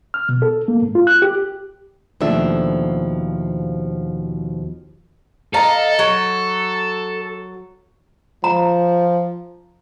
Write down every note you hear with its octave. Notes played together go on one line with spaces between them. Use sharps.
F6
B2
A4
A#3
G#2
F4
F#6
G4
D#2 B2 F3 A3 D4 E5
A4 D#5 F5 A#5
F#3
F3 A#5